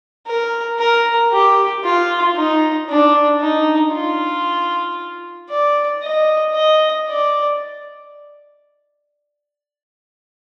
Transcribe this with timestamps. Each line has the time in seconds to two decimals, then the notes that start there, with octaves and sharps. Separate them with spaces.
0.27 A#4
0.79 A#4
1.33 G4
1.84 F4
2.36 D#4
2.89 D4
3.41 D#4
3.93 F4
5.50 D5
6.03 D#5
6.55 D#5
7.08 D5